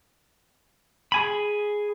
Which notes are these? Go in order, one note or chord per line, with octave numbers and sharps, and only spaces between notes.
G#4 G#5 B5